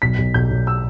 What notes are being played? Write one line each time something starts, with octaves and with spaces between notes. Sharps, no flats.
B1 B6
B1
B1 G6
B1
E6